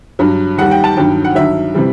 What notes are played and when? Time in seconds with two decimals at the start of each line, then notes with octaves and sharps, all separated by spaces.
0.19 G2 F#3
0.57 D#2 D#3 G3 F#5
0.71 G5
0.84 A5
0.96 G2 D#3 F#3 G5
1.24 F#5
1.35 G2 D#3 F#3 E5
1.75 C3 E3 G3